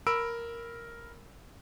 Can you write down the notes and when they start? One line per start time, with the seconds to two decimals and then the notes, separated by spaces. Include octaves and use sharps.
0.07 A#4 B5 E6 D7